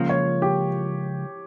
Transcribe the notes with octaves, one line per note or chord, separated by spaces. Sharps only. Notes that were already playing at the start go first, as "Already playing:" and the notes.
Already playing: C#2 C#3 F3 A#3
C#5
G4